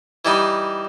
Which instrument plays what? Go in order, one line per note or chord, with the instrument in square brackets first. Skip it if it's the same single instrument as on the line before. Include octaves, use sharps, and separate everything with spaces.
[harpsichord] E3 G3 D#4